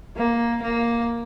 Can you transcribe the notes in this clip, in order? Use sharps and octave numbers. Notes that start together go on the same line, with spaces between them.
A#3
A#3